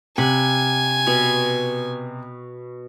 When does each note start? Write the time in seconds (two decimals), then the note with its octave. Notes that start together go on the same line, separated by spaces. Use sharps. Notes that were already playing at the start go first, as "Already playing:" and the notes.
0.18 C3 F#5 G#5 B5
1.07 B2